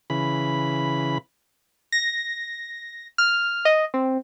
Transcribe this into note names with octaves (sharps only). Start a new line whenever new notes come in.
C#3 E3 B5
A#6
F6
D#5
C4